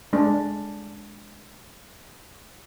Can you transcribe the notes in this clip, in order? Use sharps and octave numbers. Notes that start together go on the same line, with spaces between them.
G#3 D4